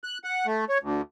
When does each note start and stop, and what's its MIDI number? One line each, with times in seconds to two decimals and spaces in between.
0.04 0.18 90
0.24 0.46 78
0.47 0.65 57
0.69 0.78 73
0.83 1.01 38